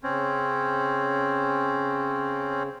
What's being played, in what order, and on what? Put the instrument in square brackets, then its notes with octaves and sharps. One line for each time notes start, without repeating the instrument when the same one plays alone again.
[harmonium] C#3 [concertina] C4 C#4